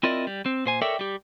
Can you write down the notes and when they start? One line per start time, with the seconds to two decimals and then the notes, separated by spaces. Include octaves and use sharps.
0.03 C4 E4 F4 A#4 D5 D#5
0.27 G3
0.46 C4
0.66 A#2 C5 G#5
0.82 A4 A#4 C#5 D5 E5 G5
0.99 G3 G4